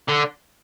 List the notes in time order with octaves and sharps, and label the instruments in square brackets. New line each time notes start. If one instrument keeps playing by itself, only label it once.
[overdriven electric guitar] D3